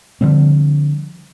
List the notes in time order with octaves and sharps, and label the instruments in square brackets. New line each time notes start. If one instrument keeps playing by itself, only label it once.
[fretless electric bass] D3 F3 G3 C4